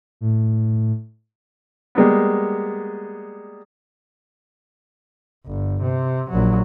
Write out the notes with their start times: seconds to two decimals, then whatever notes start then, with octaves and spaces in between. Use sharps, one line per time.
0.21 A2
1.95 G3 G#3 A#3 B3
5.47 G1
5.83 C3
6.30 A#1 F#3